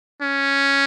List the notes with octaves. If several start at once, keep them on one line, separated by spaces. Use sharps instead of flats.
C#4